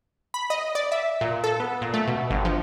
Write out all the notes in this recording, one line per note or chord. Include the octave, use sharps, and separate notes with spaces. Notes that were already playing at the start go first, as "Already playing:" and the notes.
B5
D#5
D5
E5
A#2
A4
B3
A#2
A3
B2
G1
F3